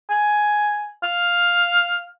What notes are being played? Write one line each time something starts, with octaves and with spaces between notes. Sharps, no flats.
G#5
F5